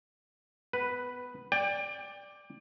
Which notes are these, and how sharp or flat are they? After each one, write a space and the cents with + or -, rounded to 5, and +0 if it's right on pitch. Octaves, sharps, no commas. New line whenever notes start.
B3 +15 B4 +0
D5 +0 G5 +30